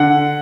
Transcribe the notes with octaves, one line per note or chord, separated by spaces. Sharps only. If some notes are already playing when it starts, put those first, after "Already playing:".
Already playing: D3 F#5